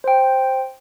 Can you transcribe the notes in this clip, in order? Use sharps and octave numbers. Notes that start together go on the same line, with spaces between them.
C5 G5